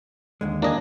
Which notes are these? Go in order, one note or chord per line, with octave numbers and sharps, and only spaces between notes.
D#2 D3 G#3
A#3 D4 D#5 G#5